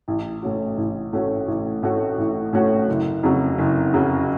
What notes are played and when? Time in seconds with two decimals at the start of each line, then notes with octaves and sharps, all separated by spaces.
0.08 A1
0.42 A2 A3 C#4 F#4
0.77 A1
1.12 A2 A3 C#4 F#4
1.48 A1
1.83 A2 A3 C#4 F#4
2.18 A1
2.53 A2 A3 C#4 F#4
2.88 F#1
3.23 F2 C#3 F#3
3.58 F#1
3.94 F2 C#3 F#3